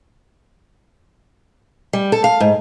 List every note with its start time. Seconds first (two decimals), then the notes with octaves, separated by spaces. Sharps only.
1.93 G3
2.12 A4
2.24 F5
2.40 G#2